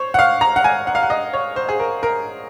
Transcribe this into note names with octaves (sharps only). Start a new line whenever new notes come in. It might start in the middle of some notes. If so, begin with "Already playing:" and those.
Already playing: C5 C#5
F#5
F5
A#5
F#5
G#5
F#5
F5
F#5
D#5
C#5
C5
G#4
A#4
A#4